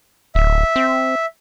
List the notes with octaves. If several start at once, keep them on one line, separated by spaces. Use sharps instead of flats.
D1 E5
C4